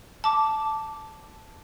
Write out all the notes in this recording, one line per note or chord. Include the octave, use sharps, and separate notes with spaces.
A5 D6